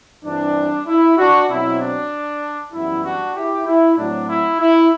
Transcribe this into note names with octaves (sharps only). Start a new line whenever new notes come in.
G2 E3 G3 C4 D4
E4
D4 F#4
B2 F#3 C4 E4
D4
F#2 E3 G3 B3 E4
D4 F#4
E4 G4
E4
A2 F#3 C4 D4
E4
E4